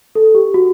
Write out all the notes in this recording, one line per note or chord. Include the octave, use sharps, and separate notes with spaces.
A4
G4
F#4